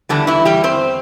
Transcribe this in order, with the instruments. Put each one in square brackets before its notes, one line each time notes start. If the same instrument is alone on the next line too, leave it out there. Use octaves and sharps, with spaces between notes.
[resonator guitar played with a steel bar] E2 D3 E3 G3 D4
E3 E4
G3 G4
C4 C5